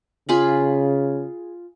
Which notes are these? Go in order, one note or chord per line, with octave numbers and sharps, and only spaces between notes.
C#3 F4 G#4 B5